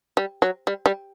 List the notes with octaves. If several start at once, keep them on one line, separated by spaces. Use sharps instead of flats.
G3
F#3
G3
G3